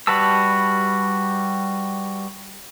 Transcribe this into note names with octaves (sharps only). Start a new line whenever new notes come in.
G3 F#4 B4 A5 E6